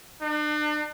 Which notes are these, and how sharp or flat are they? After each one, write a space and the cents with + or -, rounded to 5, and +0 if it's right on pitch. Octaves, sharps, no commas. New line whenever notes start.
D4 +40